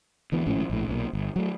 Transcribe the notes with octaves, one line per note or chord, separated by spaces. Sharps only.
D2 E3 B3
G#1 A2 F3 C#4
A#1 A2
B1 A#2
G1
F#3 A3